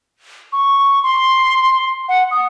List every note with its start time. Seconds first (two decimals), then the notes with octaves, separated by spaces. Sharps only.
0.52 C#6
1.03 C6
2.08 F#5
2.31 D#6